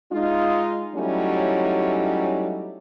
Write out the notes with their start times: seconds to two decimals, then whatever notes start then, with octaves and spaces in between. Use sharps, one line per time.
0.13 G#3 D#4 F4
0.96 F#3 G3 A3 C#4 D#4 E4